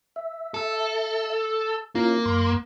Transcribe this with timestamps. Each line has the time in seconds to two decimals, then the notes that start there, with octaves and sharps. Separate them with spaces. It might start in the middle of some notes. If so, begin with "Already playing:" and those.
0.16 E5
0.54 A4
1.95 A#3 C#4 E4 F4
2.26 F#2 C6